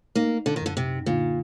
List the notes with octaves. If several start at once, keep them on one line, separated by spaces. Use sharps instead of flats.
A#3 D#4
D3
D#3
F#2 D3
C3
A#2 D3